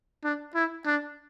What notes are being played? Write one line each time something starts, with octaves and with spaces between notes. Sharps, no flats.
D4
E4
D4